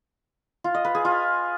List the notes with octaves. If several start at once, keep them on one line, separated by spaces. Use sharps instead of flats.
F4
D#5
B4
G#4
F4